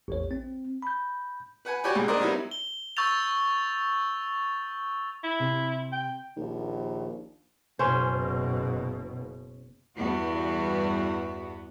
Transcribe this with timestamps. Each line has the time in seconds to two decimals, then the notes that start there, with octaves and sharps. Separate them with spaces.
0.08 A1 E2 C#5
0.31 C4
0.82 B5 G6
1.65 B4 F#5 G#5
1.84 F#4 G4 C#5 D5 G5 G#5
1.95 C#2 A#2 G#3
2.08 D4 A#4 C5 D5 D#5
2.20 F#3 G3 B3 D#4 E4
2.51 G7
2.97 C#6 E6 G6 A6 F7
5.23 E4
5.40 C3
5.92 G5
6.37 A#1 D#2
7.79 F#1 B2 C#4 C5
9.97 E2 G2 B3 F#4